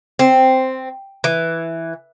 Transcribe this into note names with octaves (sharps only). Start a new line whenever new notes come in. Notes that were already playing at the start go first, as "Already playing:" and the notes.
C4
E3